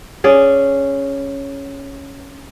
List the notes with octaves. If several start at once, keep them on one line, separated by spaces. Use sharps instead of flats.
C#4 G#4 D5